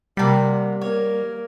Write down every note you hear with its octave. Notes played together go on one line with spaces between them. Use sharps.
C3 G3 A#3 F#5
A#3 A#4 C#5